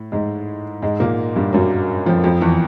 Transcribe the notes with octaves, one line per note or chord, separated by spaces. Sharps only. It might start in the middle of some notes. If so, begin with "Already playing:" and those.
Already playing: A2
G#2 G#3
G#2 G#3
A#2 A#3
G2 G3
F#2 F#3
F2 F3
F2 F3
E2 E3